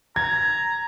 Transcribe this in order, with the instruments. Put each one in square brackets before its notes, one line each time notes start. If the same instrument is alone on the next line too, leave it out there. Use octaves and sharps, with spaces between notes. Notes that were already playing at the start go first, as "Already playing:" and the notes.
[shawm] A#5 [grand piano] G#6